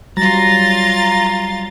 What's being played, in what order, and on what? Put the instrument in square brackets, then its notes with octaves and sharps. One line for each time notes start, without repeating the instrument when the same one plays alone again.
[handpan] F#3 G3 [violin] F4 A6 [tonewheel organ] A#5